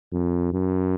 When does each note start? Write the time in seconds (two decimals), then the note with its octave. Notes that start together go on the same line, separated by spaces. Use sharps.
0.12 F2
0.53 F#2